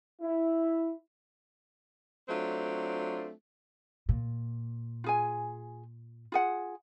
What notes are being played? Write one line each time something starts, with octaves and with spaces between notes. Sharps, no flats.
E4
F#3 A3 C4 D4 F4
A#2
F4 G#4 G#5
F4 G#4 F#5